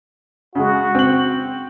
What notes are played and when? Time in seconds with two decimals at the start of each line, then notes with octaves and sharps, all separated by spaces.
0.55 C#3 G#3 F#4
0.95 C4 F#7